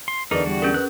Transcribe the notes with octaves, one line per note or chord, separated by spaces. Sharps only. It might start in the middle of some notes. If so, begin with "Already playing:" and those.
C6
E2 D3 D#4 G#4 A#4 B4 D5 D6
G3 F#4
C#4 G#4 A#4
B4 F#6